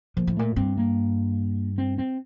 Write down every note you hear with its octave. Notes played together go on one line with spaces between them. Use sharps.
A#2 F3
A2
A#2 A3
G2 C4
A#3
C4
C4